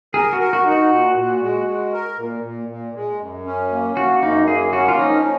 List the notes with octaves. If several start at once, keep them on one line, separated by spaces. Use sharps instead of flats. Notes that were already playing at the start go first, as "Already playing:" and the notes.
G#4 A#4
F#4
A#4
F#4
D#4
F#4
A#2
A#2
G#3
G#3
A#4
A#2
A#2
A#2
G#3
F#2
C#4
A#3
A#3 F#4
F#2 D#4
A#3 G#4
C#4 F#4
F4
F3 D#4